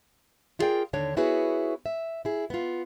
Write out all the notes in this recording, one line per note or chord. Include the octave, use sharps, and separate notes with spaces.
E4 F4 G#4 A#4 D5 G5
D#2 D3 D4 C#5
B3 E4 F#4 G#4 B4 C#5
E5
E4 G#4
B3 F4